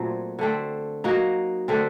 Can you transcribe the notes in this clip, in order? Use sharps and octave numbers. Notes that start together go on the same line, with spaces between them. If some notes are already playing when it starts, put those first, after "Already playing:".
Already playing: A#2 F#3 A3 C4
D3 A3 C4
F#3 A#3 D#4 F#4
D3 A3 C4